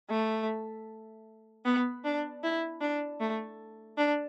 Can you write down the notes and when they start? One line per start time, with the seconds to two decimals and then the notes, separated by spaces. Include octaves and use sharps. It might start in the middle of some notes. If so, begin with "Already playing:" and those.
0.10 A3
1.65 B3
2.04 D4
2.43 E4
2.81 D4
3.21 A3
3.98 D4